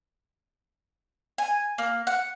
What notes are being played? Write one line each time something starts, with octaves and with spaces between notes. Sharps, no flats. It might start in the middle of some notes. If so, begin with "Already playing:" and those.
G#5
A#3
F#5